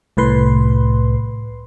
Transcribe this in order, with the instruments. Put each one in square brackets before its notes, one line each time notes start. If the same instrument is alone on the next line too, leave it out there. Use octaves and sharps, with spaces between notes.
[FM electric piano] C2 A2 B4 C6